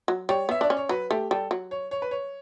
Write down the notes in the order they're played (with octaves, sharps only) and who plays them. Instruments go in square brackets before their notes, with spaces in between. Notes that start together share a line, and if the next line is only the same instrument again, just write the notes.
[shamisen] F#3
[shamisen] G3 [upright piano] C#5
[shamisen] B3 [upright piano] E5
[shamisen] D4 [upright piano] D5
[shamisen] C#4
[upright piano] C#5
[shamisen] F#3 [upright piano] B4
[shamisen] A3 [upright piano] G4
[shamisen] G3 [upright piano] A4
[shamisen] F#3
[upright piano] C#5
C#5
B4
C#5